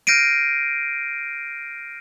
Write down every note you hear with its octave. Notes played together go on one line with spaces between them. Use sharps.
F6 G6 A#6 C7 D7 D#7